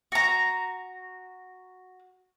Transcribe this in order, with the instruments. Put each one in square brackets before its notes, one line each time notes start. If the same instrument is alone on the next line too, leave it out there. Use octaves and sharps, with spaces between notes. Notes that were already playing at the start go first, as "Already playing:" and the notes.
[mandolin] F#4 A#5